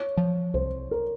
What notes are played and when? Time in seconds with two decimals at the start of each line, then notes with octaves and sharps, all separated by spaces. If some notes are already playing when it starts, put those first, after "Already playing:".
Already playing: C#5
0.17 F3
0.54 C2 C5
0.91 A#4